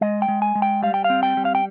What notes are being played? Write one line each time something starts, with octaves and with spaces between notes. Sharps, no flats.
G#3 D#5
G5
G#3
G#5
G#3
G5
G3 F5
G5
F5
C4
G5
G3
F5
G5